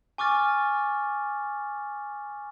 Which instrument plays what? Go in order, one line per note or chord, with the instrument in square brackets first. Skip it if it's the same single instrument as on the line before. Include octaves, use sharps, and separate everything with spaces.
[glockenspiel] G#5 C#6 D6 F6 A6